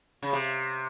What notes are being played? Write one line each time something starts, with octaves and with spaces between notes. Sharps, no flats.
C#3
C3